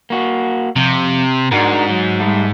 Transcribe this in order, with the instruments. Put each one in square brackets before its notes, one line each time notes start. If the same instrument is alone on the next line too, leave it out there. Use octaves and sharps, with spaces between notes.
[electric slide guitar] A#3 F#4
[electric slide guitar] F2 [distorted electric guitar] C3
[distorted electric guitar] G#2 [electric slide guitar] D4 F#4 A#4
[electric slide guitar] F#3
G3 A3